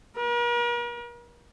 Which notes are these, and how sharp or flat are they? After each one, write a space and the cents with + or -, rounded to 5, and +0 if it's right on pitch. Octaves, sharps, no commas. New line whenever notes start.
A#4 +45